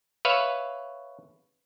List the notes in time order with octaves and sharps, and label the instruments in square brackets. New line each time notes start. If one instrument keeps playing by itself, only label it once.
[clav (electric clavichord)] B4 C#5 E5 F5